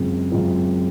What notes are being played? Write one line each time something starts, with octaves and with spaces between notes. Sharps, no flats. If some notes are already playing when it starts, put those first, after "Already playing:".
Already playing: F#2 C#3 G#3 C4 F4
F#2 C#3 G#3 C4 F4